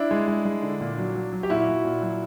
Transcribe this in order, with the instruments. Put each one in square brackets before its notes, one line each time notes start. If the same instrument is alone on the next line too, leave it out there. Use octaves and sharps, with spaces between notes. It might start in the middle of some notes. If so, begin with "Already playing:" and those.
Already playing: [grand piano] D4 E4
G#3
G#3
G#3
D3
A#2
F#3
F#3
F#3
G4
A#2 E4 F#4
A#2
A#2
F#3